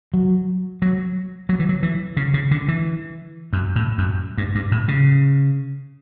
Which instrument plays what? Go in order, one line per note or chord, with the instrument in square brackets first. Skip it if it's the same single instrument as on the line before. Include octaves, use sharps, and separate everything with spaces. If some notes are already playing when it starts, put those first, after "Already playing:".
[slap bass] F#3
F#3
F#3
E3
F#3
E3
C#3
C#3
D3
E3
F#2
A2
F#2
G2
G2
A2
C#3